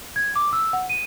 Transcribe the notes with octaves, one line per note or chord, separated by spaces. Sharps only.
G#6
D6
E6
F#5
D#7